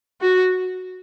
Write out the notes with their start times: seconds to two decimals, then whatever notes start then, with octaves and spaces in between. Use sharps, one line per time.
0.21 F#4